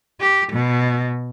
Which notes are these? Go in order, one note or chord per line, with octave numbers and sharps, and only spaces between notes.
G4
B2